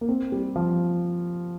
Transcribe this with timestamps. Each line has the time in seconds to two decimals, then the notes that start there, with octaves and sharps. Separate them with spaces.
0.01 A#3
0.09 C4
0.32 G3
0.56 F3